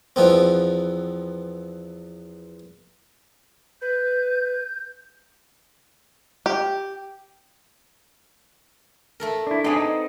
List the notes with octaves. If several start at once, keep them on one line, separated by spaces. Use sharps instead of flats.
E2 F3 B3 C4
B4 G6
G4
A3 A4 A#4
D4 E4
B3 C4 D4 G4 G#4
D#4